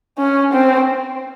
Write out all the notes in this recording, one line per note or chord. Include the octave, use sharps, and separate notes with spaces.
C#4
C4